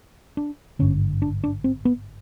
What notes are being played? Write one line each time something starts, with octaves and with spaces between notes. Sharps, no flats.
D4
G#1 G2 D3 C#4
D4
D4
C4
B3